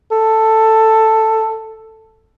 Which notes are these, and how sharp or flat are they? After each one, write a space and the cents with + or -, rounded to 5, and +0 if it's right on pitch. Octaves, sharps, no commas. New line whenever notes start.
A4 +5